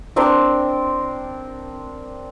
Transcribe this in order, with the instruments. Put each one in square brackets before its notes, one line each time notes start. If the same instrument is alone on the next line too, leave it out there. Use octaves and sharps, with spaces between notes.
[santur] C4 D4 A#4 C5